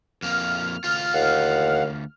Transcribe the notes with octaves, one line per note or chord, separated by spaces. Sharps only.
F2 A#3 F6
D2 F4 F6
D#2 F5 F#5